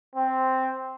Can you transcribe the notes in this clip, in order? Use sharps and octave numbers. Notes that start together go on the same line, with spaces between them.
C4